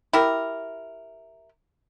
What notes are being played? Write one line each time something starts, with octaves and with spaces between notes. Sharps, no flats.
E4 G4 A#4